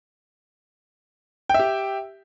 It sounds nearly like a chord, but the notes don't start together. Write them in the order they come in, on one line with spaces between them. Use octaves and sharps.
G5 E5 G4